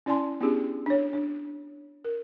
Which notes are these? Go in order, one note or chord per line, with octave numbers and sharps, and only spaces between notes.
C#4 E4 D5 G#5 A5 C6
B3 C#4 D4 E4 G4 G#4
D4 C#5
D4
A#4